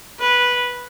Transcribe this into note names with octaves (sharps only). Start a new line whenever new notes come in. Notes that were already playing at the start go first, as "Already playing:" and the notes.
B4